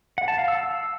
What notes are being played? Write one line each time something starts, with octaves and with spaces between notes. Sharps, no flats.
F#5
A5
F5
E6
E6